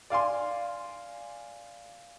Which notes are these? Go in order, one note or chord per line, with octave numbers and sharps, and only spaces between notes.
D5 F5 G#5 C6